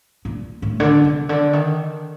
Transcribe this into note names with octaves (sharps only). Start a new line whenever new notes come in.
A#2
A2
D3
C3
D3
D#3